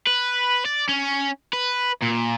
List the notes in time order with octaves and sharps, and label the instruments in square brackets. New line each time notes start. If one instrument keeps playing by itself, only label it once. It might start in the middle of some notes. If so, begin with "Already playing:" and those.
[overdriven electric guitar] B4
D5
C#4
B4
A#2